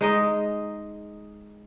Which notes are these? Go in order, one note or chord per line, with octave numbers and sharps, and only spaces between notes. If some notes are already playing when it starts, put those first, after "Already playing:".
G#3 D#4 D#5